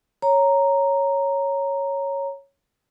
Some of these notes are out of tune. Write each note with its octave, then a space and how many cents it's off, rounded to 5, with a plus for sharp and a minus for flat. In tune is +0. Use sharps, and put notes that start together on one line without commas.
C#5 +0 A#5 +0